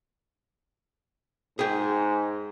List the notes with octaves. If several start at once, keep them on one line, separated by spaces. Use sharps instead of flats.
G#2 G#4 G5